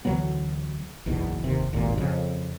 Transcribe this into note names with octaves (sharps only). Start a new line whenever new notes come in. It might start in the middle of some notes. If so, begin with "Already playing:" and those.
D2 E3 F#3 B3
F#1 B1 E2 B2
F1 D#2 C3
G#1 D#2 A#2
F2 C#3